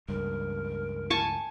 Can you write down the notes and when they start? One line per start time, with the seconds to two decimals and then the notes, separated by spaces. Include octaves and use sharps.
0.09 C#2 G2 A#4
1.10 G#5 A5 C#6